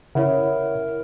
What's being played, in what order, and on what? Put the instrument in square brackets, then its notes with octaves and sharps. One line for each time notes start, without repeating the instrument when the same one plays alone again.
[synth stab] C#3 [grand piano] E4 [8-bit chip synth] A#4 [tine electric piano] C#5 F#5